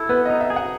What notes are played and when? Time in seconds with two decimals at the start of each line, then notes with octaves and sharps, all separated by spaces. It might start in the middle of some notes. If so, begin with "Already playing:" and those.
Already playing: E4 A4
0.09 B3 B4
0.25 D#5
0.30 D#4
0.41 E5
0.50 G#4
0.56 F#5